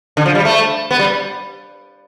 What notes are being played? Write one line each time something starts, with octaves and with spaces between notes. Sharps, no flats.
D3
F3
G3
A3
B3
G3